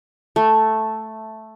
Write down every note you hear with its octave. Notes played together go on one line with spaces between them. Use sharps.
A3